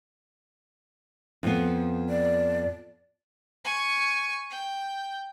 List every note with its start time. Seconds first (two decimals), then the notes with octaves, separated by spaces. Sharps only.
1.43 F2 F3 B3
2.09 D5
3.64 G#5 C#6
4.50 G5